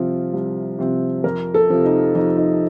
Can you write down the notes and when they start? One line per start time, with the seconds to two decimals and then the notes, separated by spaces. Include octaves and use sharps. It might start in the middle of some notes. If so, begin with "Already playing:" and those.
Already playing: C2 C3 F3 C4 F4
0.33 C2
0.79 C3 F3 C4
1.24 F2 A#4
1.54 A4
1.70 C3 F3 C4
1.84 D#4
2.15 F2 D#4
2.37 D#4